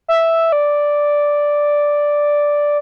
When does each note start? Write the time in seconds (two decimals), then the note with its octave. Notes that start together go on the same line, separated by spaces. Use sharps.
0.08 E5
0.52 D5